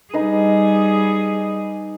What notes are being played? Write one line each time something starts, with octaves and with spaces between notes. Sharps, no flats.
G3 D#4 G#4 B4